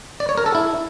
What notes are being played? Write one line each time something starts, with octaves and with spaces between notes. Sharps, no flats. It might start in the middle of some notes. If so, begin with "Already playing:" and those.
D5
C#5
A#4
A4
E4